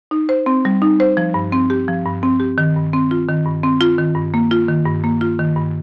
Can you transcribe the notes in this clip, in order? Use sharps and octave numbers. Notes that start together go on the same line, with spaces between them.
D#4
C5
C4
G3
D#4
C5
F3
G2
C4
G4
F3
G2
C4
G4
D#3
G2
C4
F4
D#3
G2
C4
F4
D#3
G2
A#3
F4
D#3
G2
A#3
F4
D#3
G2